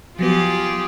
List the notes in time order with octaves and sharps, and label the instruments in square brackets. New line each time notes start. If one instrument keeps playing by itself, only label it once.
[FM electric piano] F3 F#3 B3 [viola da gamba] F4 G4 G#4